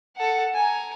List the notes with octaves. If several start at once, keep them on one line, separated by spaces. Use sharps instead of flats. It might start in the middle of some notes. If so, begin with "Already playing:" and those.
A4 F#5
G#5 A#5